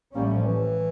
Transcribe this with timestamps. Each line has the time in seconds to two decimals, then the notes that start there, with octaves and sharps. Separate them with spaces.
0.13 A1 A2 G3 A#3 C#4
0.24 A3
0.35 F3
0.46 E3